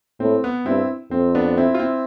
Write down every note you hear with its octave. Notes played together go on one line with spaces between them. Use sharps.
A2 C4
B3
G2 C4 E4
F2 C4
B3 D4
C4 E4
F4
C4 E4